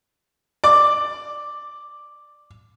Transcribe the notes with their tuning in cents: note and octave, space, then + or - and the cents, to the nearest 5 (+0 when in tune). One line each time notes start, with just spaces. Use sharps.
D5 +15 D6 +0